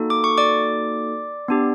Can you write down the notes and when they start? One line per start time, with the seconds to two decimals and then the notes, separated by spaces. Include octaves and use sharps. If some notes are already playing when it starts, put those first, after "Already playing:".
Already playing: A#3 D#4 F#4 A4
0.10 D6
0.24 C#6
0.38 D5 D6
1.48 B3 D4 G4